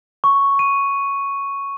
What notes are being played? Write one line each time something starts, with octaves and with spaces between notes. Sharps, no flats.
C#6
D#7